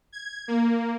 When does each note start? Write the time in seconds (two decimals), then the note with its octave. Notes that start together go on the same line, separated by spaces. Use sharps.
0.12 G#6
0.48 A#3